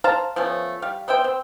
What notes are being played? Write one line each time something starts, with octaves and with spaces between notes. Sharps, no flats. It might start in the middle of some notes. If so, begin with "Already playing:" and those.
C5 F5 A5 A#5
F3 A3 B3 C#4
G3 F5
B3 C5 E5 G5
C4